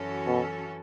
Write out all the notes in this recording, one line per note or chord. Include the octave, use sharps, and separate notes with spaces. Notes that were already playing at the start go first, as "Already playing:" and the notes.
Already playing: F#2 E3 C#4 F#4 A4
B2